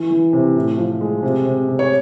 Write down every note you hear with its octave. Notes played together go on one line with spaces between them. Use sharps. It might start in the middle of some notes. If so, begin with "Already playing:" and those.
Already playing: E3
E3
C3
A2
F3
G#3
C3
C3
C3
C#5